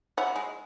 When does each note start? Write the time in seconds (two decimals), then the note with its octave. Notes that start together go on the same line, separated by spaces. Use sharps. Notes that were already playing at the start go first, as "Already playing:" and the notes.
0.17 C#4 E4 F#5
0.27 A#3
0.36 G#3